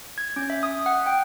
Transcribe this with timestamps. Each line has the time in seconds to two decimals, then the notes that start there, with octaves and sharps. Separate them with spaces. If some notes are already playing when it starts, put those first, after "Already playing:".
0.18 G#6
0.36 C#4
0.50 E5
0.63 D#6
0.86 F#5
1.06 G5